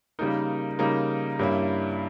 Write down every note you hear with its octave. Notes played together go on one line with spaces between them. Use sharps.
C#3 G3 A#3 D#4 A#4
C#3 G3 A#3 D#4 A#4
G2 G3 A#3 C#4 E4